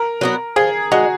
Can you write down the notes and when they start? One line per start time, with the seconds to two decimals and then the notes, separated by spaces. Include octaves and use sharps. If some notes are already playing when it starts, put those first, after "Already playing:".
Already playing: A#4
0.21 F#3 B3 F#4
0.56 F3 G#4
0.92 G#3 D#4 F#4